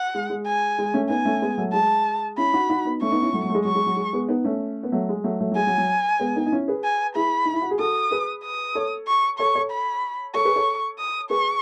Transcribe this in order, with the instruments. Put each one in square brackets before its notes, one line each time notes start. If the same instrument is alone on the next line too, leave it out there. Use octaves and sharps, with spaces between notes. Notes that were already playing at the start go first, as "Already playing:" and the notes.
Already playing: [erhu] F#5
[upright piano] G#3
G#3
[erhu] G#5
[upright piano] G#3
A3 C#4
[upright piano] B3 D#4 [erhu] G#5
[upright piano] A3 C#4
G#3 B3
F#3 A3
[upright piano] G#3 [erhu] A5
[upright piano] C#4 E4 [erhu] B5
[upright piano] D#4 F#4
D#4 F#4
B3 D#4
[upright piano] A3 C#4 [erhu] C#6
[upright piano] B3 D#4
C#4 E4
F#3 A3
F#3
A3
G#3
[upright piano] F#3 [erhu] C#6
[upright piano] G#3
F#3
G#3
G#3 B3
B3 D#4
A3 C#4
B3
F#3 A3
G#3
F#3 A3
F#3 A3
F#3
[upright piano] G#3 [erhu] G#5
[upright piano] F#3
F#3
G#3 B3
B3 D#4
D#4
C#4 E4
G#4 B4
[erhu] G#5
[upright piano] E4 G#4 [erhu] B5
[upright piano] D#4
E4
F#4
G#4
[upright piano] F#4 A4 [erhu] D#6
[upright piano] G#4 B4
[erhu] D#6
[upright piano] A4 C#5
[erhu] C#6
[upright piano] A4 C#5 [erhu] C#6
[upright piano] A4 C#5
[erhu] B5
[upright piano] A4 C#5 [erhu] C#6
[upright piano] G#4 B4
A4 C#5
[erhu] D#6
[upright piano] G#4 B4 [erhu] C#6